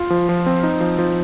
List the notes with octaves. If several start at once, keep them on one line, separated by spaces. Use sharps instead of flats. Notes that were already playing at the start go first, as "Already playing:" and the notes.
Already playing: F4
F3
F3
C4
D#4
F3
F3